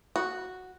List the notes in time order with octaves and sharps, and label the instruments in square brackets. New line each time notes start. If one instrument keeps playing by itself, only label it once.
[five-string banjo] F#4